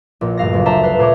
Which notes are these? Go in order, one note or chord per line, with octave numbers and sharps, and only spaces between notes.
A#1 A#2
D2 G2 F5 A#6
F#1
D4 C5 E5 A5 A#5
B4 C5 E5 F5
A#2 C5 C#5 A#5 D6